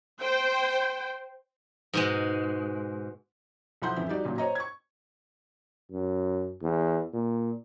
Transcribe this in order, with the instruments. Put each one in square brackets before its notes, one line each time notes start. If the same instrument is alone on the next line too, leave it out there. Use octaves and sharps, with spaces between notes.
[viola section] C5 G5
[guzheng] G#2 B2 G#3
[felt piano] B1 F3 E4 F#5 C6 G6
A1 F2 E3 E4
G3 D#4 F#4 D5
A1 A#2 F#3
C5 C#5 D#5 A#5
C#6 G#6
[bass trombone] F#2
E2
A#2